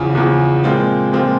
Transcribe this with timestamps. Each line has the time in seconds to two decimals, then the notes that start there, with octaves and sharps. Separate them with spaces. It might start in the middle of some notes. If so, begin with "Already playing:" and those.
Already playing: E2 C#3 F3
0.15 E2 C#3 F3
0.64 A#2 F3 G#3 C4 F4
1.13 A#2 F3 G#3 C4 F4